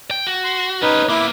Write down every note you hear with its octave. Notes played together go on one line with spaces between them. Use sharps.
G5
F#4
C6
C#4 D#4 G4 B4
A#3 B3 E4 D6